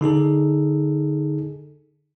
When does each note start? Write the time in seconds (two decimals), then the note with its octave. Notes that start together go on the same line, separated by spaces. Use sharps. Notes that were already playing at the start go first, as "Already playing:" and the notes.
0.01 D3 D#4 G#4 A4